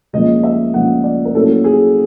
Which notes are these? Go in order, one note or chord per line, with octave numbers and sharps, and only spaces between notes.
C#2 C#3 F3 A#3 D#5
E5
C#2 C#3 F3 A#3 F#5
D5
A#4
A2 F#3 A#3 C#4 A4
G#4